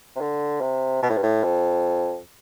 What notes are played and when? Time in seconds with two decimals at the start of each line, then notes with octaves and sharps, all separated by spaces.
0.16 C3
0.21 D3
0.61 C3
1.03 B2
1.09 A2
1.17 G2
1.23 A2
1.44 F2